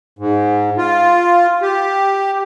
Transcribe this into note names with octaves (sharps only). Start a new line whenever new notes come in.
G#2
F4
G4